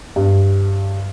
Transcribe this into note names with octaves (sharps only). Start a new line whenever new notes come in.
G2